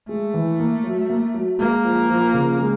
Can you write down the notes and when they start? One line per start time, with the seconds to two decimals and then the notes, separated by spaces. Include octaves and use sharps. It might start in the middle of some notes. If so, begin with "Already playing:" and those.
0.09 G#3 A3
0.34 E3
0.59 A#3
0.84 F#3
1.10 A#3
1.34 F#3
1.59 G#3 A#3
1.84 F3
2.10 F3
2.34 C#3
2.59 G#3